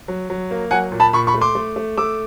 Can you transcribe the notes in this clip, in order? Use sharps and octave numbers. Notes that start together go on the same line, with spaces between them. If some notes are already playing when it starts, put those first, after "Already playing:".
F#3
F#3
A#3
F#3 F#5 G#5
A#2
A5 B5
A#2 B5 C#6
B5 C#6
A3
C6 D6
A3
A3
A3 D6 E6